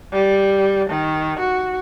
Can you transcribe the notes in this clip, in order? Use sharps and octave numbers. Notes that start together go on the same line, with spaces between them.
G3
D#3
F#4